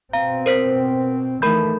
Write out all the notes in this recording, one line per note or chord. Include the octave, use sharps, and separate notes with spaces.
B2 C4 F5 A#5
A#4 C5 B6
D#3 E3 A3 A#4 B5 G6